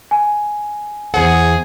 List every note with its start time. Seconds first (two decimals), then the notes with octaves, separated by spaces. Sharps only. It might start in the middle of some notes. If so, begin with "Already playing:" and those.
0.11 G#5
1.14 E2 G#4 C5 F#5